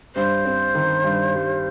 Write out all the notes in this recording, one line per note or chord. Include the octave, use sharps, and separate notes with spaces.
G2 C5
C4
D#3
G2
G3